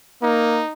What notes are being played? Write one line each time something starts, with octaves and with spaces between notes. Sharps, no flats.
A#3 D#4